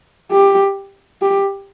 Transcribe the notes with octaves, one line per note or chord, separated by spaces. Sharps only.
G4
G4